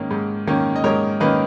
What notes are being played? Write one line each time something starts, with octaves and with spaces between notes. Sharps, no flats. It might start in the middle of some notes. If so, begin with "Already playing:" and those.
Already playing: G#2 D#3 A#3 C#4
G#2
D#3 A#3 C#4
D#5
G#2 A#4 C#5
D#3 A#3 C#4 B4 D#5